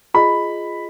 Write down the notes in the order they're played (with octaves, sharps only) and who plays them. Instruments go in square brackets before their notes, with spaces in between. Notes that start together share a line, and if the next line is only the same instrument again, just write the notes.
[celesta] F4 G#4 D#5 [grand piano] B5